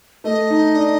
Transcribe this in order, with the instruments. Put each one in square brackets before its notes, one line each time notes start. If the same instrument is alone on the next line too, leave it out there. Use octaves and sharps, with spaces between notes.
[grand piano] A3 [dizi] D#5
[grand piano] D#4
D4